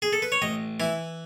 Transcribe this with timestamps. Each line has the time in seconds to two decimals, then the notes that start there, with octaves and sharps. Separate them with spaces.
0.02 G#4
0.13 A4
0.22 B4
0.32 C#5
0.42 A1 D#5
0.80 E3 E4